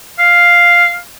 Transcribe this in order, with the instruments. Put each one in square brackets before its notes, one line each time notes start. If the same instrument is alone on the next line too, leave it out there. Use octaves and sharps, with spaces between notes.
[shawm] F5